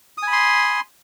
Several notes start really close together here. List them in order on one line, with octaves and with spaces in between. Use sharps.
D#6 G#5 B5 C6